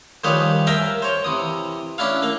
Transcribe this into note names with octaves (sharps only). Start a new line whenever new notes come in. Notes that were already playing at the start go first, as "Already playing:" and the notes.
D#3 F3 G3 G#4 B4 C#5
A#4 E5 F5 G5 G#5 A#5
C5 C#5
C3 E3 D#6
C#4 D4 E4 F5
A#3 F5